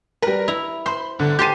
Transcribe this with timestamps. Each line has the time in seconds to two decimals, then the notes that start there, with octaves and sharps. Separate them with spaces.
0.22 G3 A#4 B4
0.48 E4 F7
0.86 C5 B5 C6
1.19 G1 D3
1.39 G4 C5 A5 G6 C7 D#7